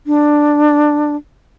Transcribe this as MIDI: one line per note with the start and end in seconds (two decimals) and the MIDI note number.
0.07 1.16 62